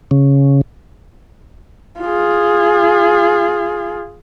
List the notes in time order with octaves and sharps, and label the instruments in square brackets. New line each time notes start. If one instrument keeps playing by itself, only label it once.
[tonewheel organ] C#3
[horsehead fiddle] F4 G#4